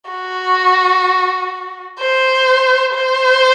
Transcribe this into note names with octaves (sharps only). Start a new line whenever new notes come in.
F#4
C5
C5